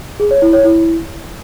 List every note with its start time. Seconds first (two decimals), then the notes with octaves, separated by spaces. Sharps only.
0.20 G#4
0.31 C#5
0.42 E4
0.53 C#5
0.64 E4